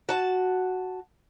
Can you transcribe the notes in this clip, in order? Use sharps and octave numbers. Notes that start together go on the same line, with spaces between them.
F#4 A5